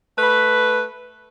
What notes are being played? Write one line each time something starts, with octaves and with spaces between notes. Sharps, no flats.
A3 B4